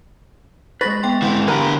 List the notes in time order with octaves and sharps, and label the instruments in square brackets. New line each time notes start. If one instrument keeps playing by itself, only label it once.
[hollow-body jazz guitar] G#3 B4 [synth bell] C#6 A6 A#6
[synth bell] B3 G5 C6
[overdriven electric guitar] G#2 E3 [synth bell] F#5 C6
[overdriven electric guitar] D3 G4 [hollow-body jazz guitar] A#4 B4 G#5